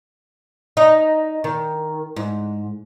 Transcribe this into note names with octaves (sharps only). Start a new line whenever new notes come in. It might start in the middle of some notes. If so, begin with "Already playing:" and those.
D#4 D#5
D#3
G#2